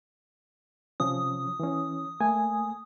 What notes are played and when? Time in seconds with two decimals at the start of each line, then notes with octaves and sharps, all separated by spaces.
1.00 C3 F3 C#4 D#6
1.60 E3 C#4
2.21 A3 A#3 G#5